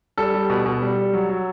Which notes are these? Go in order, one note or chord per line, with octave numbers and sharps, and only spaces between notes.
G3 A4
G3
B2
B2
G3
G3
F#3
F#3